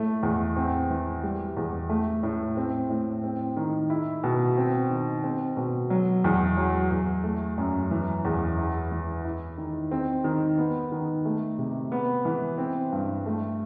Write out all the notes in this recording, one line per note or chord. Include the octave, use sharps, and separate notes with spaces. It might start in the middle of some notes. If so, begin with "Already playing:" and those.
Already playing: A2 A3
E2
C4
E3
G3
E2
A3
A2
C4
A2
C4
D#3
E4
B2
C4
D#3
C4
B2
F#3
E2
F#3
E2
A3
F#2
E3
E2
E4
E3
E4
D#3
C4
D#3
B3
D#3
A3
C3
B3
E3
C4
G2
A3